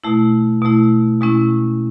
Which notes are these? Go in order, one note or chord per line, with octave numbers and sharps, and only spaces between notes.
B2 A3 E4
B2 A3 E4
B2 G#3 C#4 E4